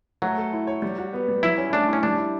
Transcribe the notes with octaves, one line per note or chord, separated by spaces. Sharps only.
F#3 A3
A4
E4
C#5
G3
F#4
B3
G3
F#3 E4
C#4
A3 D4
E4
C#4
G3 D4
E4